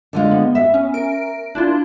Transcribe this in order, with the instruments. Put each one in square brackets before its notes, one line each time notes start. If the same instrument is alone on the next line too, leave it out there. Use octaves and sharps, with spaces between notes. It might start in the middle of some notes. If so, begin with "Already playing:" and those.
[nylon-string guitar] D3 G#3 F4
[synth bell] B3
[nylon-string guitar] E5
[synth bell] C#4
A#4 D7
D4 E4 F4